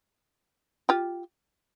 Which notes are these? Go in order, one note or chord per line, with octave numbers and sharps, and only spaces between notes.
F4 G4